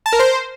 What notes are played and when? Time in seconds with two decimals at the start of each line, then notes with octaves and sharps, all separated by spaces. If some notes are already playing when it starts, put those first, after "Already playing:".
0.06 A5
0.13 A#4
0.19 C5